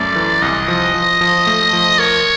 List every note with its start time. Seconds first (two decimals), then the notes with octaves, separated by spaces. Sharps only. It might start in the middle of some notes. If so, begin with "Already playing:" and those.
Already playing: F#2 A3 D5
0.16 E3
0.42 C2 D#5
0.68 F3
0.94 F3
1.21 F3
1.47 A3
1.73 F3
1.99 A#4 C#5